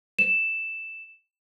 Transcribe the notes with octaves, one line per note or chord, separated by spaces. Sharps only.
E7